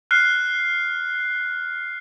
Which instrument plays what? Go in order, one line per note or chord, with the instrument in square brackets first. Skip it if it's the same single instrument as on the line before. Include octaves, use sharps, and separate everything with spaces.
[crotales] F6 F#6 C7